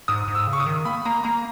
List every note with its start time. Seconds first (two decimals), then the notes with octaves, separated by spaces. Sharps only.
0.08 G#2 D#6
0.28 G#2
0.35 E6
0.47 C#3
0.53 C#6
0.60 D#6
0.66 D#3
0.85 A#3 B5
1.05 A#3 A#5
1.24 A#3 A#5